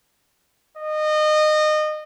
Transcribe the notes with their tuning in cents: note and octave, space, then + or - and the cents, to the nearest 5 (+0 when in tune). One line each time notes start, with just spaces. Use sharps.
D#5 -25